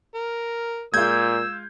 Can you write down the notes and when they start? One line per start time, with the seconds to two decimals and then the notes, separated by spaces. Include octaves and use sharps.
0.14 A#4
0.94 A#2 G#3 F4 E6 G6 G#6